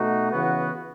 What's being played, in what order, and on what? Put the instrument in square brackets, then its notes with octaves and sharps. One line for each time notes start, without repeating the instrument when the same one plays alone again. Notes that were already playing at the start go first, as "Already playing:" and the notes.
Already playing: [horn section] B2 A3 D#4 F#4
C#3 E3 B3 F#4